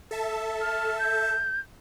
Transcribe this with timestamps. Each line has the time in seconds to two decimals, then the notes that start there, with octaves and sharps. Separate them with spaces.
0.11 A4 E5 A5
0.61 F6
0.99 G6